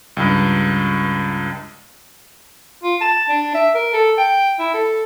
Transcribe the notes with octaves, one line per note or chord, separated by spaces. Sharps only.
C#2 G2
F4
A5
D4
E5
A#4
A4
G5
E4
A4